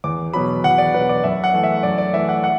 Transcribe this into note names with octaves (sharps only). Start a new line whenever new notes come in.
E2 D6
B2 F#3 B5
E2 F#5
D5
B2 F#3 B4
D5
F#2 E5
F#5
E3 A3
E5
F#2 D5
D5
E3 A3 E5
F#5
F#5